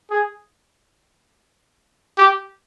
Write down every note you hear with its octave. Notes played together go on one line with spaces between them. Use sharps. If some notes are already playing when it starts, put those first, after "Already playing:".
G#4
G4